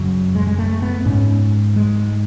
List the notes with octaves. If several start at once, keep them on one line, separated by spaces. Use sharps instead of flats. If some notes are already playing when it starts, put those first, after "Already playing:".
Already playing: F#2 C#3 F#3
G#3
G#3
A3
B3
G#2 C#4
G#3